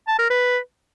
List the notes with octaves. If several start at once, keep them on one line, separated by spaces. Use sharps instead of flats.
A5
A#4
B4